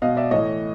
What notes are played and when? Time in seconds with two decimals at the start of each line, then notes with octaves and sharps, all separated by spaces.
0.02 B2 D#5 F5
0.17 D5 E5
0.31 A2 E3 C#5 D#5